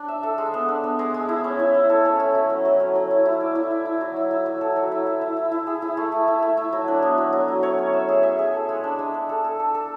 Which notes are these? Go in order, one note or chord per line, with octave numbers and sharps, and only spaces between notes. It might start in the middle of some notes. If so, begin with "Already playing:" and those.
Already playing: D4
E5
A4
G#3
B3
D4
B3
G#3
G#3
E4
C#4
E4
E4
A4
C#4
A3
F#3
C#4
F#3
C#4
F#3
E4
E4
D5
E4
E4
E4
F#3
E4
E4
F#3
A4
F#3
E4
E4
E4
E4
E4
G#4
E4
A3
A3
E4
A3
E4
F#3
D4
B3
F#3
F#3
F#3
C#5
C#4
E5
G#4
E5
G#4
A4
G#3
D4
G#3
D4
A4
A4
A4
A4